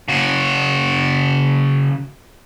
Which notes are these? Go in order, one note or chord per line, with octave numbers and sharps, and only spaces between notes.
C#3 F#4